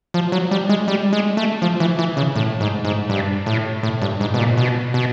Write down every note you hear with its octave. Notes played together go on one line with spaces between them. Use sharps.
F3
F#3
G3
G#3
G3
G#3
A3
F3
E3
E3
C#3
A2
G#2
G#2
G2
A2
A2
G2
G#2
B2
A#2
B2
B2